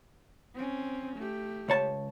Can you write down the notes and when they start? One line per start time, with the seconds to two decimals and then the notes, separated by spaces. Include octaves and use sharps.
0.54 C4 C#4
1.17 A3 G4
1.69 C#2 C#5 A5